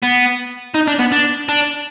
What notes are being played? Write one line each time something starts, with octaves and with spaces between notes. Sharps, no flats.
B3
D#4
D4
B3
D4
D4